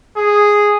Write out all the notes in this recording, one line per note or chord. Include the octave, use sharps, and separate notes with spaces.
G#4